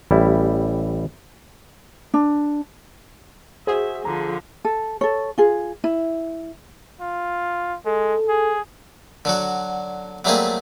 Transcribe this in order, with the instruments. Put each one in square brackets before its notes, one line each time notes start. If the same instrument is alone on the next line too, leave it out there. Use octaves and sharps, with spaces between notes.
[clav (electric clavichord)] A1 G3 E4
[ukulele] D4
[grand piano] F#4 C5 [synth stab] G#4 [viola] E5
[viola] D3 F3 [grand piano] A#5
[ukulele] A4
A4 C#5
F4 G#4
E4
[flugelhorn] F4
[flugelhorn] G#3 [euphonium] A4
[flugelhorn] G#4
[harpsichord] D3 F#3 F#4
F#3 G3 A3 A#3 C4 G#4